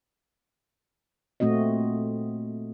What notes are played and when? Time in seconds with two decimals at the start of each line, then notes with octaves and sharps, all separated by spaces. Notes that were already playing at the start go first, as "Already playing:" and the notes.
1.40 A#2 A3 C4 F#4 D#5